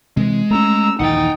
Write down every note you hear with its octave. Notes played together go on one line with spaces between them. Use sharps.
C3 E3 G#3
A3 A#3 C#4 A#5 E6
A#1 D#2 E3 D#4 F#5 G5 A6